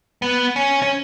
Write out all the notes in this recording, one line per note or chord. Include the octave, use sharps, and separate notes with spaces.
B3
C#4
C#4